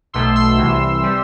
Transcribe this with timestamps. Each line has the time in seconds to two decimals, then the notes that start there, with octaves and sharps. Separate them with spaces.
0.13 B1 B2 A3 C6 E6
0.36 C6 E6
0.58 C2 C3 E3
1.03 C3 G3